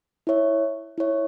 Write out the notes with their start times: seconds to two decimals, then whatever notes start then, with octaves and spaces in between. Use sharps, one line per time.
0.27 E4 C#5 E5
0.98 E4 C#5 E5